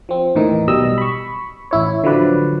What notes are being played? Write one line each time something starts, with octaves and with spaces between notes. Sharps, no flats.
F3 C4
D#2 A2 D#3 E3 D#4
B1 B2 G3 D#5 E6
B5 C#6
A1 E4 C#5
D3 F3 F#3 B4 D5